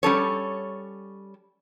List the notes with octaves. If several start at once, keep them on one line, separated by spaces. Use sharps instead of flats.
G3 C#4 A4 C#5